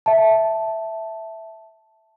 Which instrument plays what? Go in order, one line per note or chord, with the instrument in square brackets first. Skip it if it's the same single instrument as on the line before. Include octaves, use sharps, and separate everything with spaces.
[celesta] E5 A5